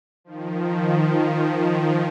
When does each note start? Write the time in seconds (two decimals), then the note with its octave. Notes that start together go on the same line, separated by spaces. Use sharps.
0.24 D#3 F3